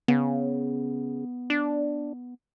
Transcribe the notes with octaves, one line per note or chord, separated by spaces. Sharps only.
C#3 B3
D4